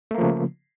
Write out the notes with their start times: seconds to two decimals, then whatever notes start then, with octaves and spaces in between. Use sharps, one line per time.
0.11 A3
0.14 A#3
0.18 F3
0.22 C#3